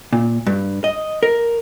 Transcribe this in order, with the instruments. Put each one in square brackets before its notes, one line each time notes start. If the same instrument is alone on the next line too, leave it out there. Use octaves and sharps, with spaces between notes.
[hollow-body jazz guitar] A#2
G2
D#5
A#4